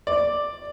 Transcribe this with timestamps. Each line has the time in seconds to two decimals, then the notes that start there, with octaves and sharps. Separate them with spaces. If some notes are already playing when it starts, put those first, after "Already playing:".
0.07 D5